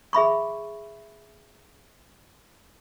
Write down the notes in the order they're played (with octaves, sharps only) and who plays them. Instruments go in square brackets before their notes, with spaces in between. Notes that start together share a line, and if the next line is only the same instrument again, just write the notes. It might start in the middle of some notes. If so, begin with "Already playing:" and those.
[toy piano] G#4 E5 B5 C#6